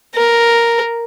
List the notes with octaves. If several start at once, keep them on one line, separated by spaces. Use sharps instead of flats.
A#4